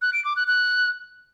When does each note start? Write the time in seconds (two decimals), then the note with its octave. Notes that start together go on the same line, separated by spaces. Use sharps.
0.02 F#6
0.13 D7
0.25 D6
0.36 F#6
0.48 F#6